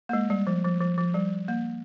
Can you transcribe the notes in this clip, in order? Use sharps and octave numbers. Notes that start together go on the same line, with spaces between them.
A#3
G#3
G3
F3
F3
F3
F3
G3
A#3